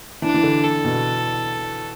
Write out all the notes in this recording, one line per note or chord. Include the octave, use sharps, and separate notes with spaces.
E3 D4
E3
D3
A4
B2